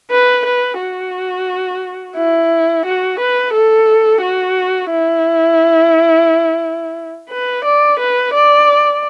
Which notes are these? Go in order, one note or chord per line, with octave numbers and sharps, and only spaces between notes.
B4
B4
F#4
E4
F#4
B4
A4
F#4
E4
B4
D5
B4
D5